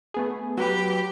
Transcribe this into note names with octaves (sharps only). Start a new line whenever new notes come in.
A3 B3 G#4
F#3 G4 B4